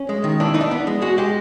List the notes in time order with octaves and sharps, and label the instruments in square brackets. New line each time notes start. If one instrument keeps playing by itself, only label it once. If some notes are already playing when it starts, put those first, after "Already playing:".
Already playing: [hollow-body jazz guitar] C#4
G#3
D#3
E3 D4
E3 D#4
D4
B3
G#3
G#3 F#4
G#3 G4